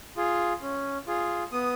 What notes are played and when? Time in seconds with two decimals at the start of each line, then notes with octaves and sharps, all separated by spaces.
0.17 F4 G#4
0.62 C#4
1.07 F4 G#4
1.52 B3 D#6